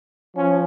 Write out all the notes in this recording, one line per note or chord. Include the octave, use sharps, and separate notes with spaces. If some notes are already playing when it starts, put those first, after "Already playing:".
F3 C#4